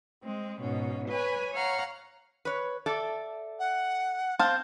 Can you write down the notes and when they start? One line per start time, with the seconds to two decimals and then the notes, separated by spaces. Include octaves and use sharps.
0.23 G#3 C4
0.61 G#2 B2 C#4
1.09 B4 C#5 G#5
1.54 C#5 F5 F#5 A#5
2.45 B4 C#5
2.86 A4 D5 E5
3.59 F#5
4.39 C4 F5 A5 G6